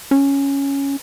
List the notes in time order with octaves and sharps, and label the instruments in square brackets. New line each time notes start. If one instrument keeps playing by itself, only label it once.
[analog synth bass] C#4